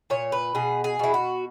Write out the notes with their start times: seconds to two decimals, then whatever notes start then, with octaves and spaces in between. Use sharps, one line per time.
0.10 A#2 C#5
0.32 B4
0.55 B2 G#4
0.84 G#4
0.99 B2 E4
1.14 F#4